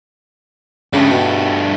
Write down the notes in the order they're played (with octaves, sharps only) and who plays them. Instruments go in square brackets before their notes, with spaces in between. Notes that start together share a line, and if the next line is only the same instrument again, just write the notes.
[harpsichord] C#2 C#3 [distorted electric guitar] G2 A3
[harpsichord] B2